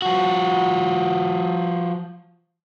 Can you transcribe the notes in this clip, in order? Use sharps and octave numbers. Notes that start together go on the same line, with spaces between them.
F3 F#4